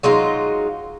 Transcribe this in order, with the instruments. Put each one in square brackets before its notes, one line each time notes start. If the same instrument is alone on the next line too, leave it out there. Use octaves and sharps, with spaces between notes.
[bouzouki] F#3 G#3 D#4 F4